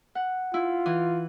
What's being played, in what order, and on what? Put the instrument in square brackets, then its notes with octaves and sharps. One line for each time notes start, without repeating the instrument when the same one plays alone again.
[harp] F#5
[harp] E4 [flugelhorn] F4
[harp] E3